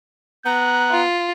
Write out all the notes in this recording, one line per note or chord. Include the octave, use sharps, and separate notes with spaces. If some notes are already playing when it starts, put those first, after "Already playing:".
B3 A#5 F#6
F4